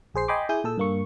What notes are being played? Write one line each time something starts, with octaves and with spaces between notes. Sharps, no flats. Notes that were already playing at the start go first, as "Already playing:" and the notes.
A#1 G#4 C5 C7
D#5 G5 G#5 B5 C6 D6
E4 G#4 D#6 G6
A#2 A4 E6
G2 A#3 C#6